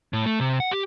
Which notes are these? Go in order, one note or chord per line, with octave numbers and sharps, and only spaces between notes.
A2
A3
C3
F#5
G4